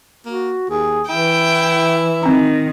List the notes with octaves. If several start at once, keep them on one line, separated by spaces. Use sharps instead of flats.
A#3 F#4
D#2 G#4
E3 E4 G5
D#3 C4 A#5